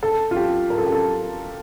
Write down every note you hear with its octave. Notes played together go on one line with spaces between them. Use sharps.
A4
F4
G4
A#4
A4
G4
A4